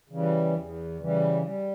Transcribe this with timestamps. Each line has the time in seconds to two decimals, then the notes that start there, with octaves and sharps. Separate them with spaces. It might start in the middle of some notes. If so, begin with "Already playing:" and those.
0.09 C#3 E3 G3
0.53 E2
0.98 C#3 E3 G3
1.42 G3